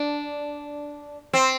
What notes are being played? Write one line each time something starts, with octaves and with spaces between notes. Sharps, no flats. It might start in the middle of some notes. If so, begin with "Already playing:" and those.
Already playing: D4
C4